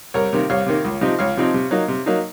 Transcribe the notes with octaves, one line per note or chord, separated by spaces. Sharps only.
C2 A#4 C#5
C3 D#3 A#3
C2 C#5 F5
C3 D#3 A#3
C#2
C3 F3 C4 D#4
C#2 C#5 F5
C3 F3 C4 D#4
C3
F#3 A#3 D#4
C3
F#3 A#3 D#4